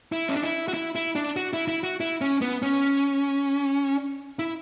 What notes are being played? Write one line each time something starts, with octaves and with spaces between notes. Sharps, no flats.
E4
C#4
D4
E4
F#4
E4
E4
D4
F#4
E4
E4
F#4
E4
C#4
B3
C#4
E4